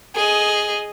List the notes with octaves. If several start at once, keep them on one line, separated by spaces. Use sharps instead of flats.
G#4 D#5